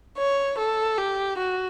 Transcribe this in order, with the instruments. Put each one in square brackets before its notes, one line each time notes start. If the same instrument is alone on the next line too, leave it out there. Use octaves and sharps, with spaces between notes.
[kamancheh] C#5
A4
G4
F#4